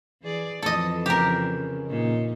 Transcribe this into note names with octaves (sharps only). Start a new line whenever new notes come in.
E3 G#4 D5
F2 E3 A4 D#5
C#3 G4 A#4
A#2 D#4